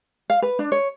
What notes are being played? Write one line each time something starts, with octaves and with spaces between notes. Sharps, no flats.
F5
B4
D4
C#5